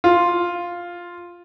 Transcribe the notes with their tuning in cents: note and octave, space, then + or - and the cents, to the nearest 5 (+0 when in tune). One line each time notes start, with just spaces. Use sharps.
F4 +0